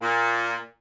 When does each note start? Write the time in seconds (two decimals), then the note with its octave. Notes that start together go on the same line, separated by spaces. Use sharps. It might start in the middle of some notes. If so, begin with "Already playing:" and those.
0.01 A#2